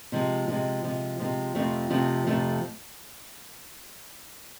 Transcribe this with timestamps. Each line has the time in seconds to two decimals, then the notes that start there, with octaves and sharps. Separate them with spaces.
0.12 C3 F3 G#3
0.48 C3 F3 G#3
0.84 C3 F3 G#3
1.19 C3 F3 G#3
1.55 F2 C3 F3 A3 C4
1.90 F2 C3 F3 A3 C4
2.27 F2 C3 F3 A3 C4